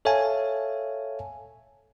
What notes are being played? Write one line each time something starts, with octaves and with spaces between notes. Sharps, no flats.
A4 C#5 E5 F5 G#5 A5